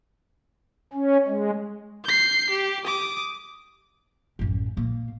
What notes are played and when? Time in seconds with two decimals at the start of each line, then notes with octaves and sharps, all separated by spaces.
0.93 C#4
1.27 G#3
2.05 G6 C7
2.50 G4
2.84 D6 D#6
4.39 A1 F#2
4.77 A#2 A#3